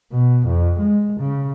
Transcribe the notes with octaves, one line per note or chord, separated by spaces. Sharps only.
B2
F2
G#3
C#3